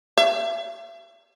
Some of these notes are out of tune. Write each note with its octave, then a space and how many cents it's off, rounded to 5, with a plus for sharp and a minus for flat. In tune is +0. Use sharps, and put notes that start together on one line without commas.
E5 +40